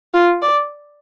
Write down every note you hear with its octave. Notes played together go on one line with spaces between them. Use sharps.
F4
D5